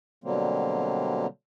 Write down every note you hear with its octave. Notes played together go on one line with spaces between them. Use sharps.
B2 D3 F#3 G3 A#3 C4